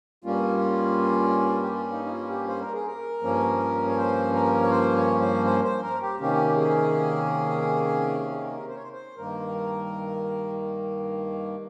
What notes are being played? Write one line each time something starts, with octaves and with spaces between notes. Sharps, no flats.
G2 G3 A#3 C#4 F4
G4
F4
D#4
D#4
F4
G4
C5
A#4
G#4
A#4
G2 F3 A#3 C#4
C#5
C5
A#4
C#5
C5
C#5
C5
C5
C5
A#4
G4
C3 D#3 A#3 C#4 G4
G#4
G#4
A#4
C5
C#5
C5
C5
G2 D#3 A#3 A#4